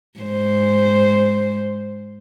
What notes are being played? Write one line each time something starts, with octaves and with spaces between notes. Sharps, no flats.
G#2 C5